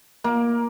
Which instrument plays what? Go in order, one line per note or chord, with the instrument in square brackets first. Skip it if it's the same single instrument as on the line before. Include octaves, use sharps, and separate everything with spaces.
[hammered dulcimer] A#3